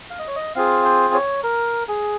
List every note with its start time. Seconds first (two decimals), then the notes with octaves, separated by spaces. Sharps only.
0.10 F5
0.19 D#5
0.27 C#5
0.36 D#5
0.55 C4 F4 G#4 F5
0.85 C5
1.14 C#5
1.44 A#4
1.89 G#4